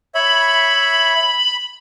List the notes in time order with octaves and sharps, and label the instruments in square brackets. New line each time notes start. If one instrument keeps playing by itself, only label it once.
[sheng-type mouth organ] C#5 E5 [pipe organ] B5